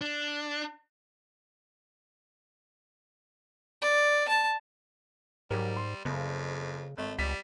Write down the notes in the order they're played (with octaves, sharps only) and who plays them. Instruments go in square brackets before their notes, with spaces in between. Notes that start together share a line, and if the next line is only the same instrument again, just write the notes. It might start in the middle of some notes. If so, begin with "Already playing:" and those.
[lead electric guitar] D4
[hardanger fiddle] D5
A5
[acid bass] G#2 [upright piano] F#3 G4 A#4 [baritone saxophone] G3
[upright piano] C6
[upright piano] F#1 [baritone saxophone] F2 [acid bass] C#3
[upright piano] G#1 [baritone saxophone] A3
[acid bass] C#2 [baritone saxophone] G3 [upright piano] B6